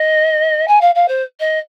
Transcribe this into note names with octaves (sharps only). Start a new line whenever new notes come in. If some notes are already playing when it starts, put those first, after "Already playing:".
Already playing: D#5
G#5
F5
F5
C5
D#5